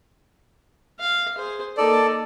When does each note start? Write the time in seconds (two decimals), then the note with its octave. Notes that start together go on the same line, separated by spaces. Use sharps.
0.99 F5
1.37 G#4 C5
1.77 A#3 D#4 A4 D5